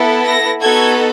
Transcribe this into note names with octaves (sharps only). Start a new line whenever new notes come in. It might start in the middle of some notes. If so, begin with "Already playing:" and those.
Already playing: B3 E4 A4
A#6
B3 D#4 F#4 A4 G#6